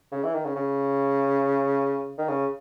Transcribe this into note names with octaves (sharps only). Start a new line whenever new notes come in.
C#3
E3
D#3
C#3
C#3
D#3
C#3